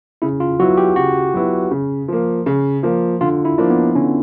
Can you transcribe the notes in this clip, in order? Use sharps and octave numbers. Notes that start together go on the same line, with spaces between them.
C#3 E4
F4
F#3 B3 E4 F#4
G4
C#3 F#4
F#3 B3 E4
C#3
F3 A#3
C#3
F3 A#3
D3 F4
E4
F3 A#3 D4
B3
D3 C#4